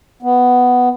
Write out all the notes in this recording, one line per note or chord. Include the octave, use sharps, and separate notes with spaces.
B3